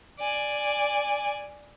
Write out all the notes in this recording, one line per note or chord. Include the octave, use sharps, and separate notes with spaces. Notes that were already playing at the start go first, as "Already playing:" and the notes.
D5 G#5